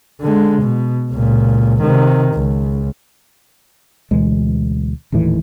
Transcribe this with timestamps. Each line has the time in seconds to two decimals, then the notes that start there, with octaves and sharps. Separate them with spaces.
0.21 D3 G#3
0.62 B2
1.12 C#2 A#2
1.82 C3 D#3
2.34 C#2
4.11 D2 B2 E3 G#3
5.12 D#1 D#2 A2 E3